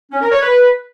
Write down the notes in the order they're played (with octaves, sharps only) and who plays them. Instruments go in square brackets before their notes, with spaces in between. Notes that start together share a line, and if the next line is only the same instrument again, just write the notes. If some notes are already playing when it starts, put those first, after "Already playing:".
[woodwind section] C#4
A#4
C#5
B4